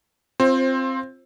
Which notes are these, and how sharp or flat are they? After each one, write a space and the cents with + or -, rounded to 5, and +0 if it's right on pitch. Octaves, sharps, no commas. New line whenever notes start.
C4 +10 F4 +0 C5 +25